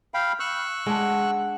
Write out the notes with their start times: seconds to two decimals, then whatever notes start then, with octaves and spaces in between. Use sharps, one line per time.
0.14 F5 G5 B5
0.40 C#6 E6 F#6
0.86 G#3 D4 F#5